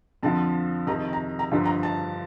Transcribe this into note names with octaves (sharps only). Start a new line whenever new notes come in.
F2 D3 F3 A5
F2 C3 D#3 A#5
A#5
A#5
G2 D3 F3
A#5
A5